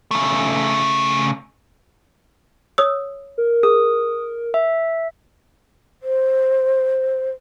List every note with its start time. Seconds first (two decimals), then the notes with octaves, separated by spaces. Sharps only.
0.11 C#3 A3
2.78 C#5 D#6 E6
3.38 A#4
3.63 G#4 D#6
4.54 E5
6.02 C5